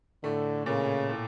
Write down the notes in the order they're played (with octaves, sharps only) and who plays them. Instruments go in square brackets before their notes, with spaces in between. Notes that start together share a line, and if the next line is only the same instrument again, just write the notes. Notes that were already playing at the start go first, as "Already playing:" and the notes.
[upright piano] A2 A3 [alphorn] D3
[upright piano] A#2 A#3 [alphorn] C#3
[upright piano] A2 A3